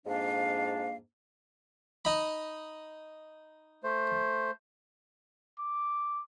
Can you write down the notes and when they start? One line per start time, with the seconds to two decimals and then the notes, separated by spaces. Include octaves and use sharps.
0.06 F2 G#2 A#3 D4 F5
2.05 D#4 B5
3.84 A3 C5
5.59 D6